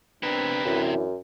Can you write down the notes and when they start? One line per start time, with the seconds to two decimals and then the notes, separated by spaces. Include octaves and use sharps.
0.23 C3 B3 C4 D4 A#4 B4
0.65 F#2 E3 D4 E4